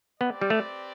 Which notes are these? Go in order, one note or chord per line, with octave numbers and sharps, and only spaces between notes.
B3 C4 G4 B4 D5
G3
A3